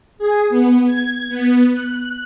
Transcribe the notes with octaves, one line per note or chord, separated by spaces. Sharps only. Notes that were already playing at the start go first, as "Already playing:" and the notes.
G#4
B3
G#6
B3
F#6